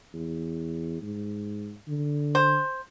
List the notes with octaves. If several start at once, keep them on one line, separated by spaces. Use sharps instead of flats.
E2
G#2
D3
C5